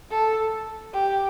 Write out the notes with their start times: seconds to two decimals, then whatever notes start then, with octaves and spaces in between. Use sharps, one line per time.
0.11 A4
0.93 G4